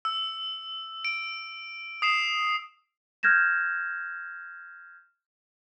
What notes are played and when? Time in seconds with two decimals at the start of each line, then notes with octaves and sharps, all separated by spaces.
0.05 E6
1.05 D7
2.02 D#6 C7 E7
3.23 F6 G6 G#6 A#6 E7